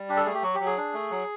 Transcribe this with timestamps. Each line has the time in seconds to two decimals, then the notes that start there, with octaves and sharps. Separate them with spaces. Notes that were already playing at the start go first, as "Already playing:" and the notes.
Already playing: G3
0.09 D4 G4
0.17 A4
0.25 A3 G#4
0.34 G4
0.42 F#3 F#4
0.54 G4
0.60 F#3
0.66 G#4
0.77 D4
0.94 A3
1.11 F#3